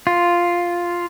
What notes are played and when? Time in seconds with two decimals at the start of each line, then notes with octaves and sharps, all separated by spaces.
0.07 F4